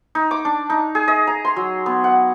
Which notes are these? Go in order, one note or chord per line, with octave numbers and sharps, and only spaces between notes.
D#4
D6
D4
D#4
G#4
D#5
A#5
C6
F#3
B3
F#5